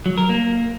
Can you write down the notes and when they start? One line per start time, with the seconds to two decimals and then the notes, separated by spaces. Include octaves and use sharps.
0.06 F#3
0.18 A#4
0.29 A#3